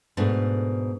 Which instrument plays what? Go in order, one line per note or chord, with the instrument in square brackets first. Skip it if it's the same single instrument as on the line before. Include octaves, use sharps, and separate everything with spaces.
[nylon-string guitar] G#2 B2 A3 D4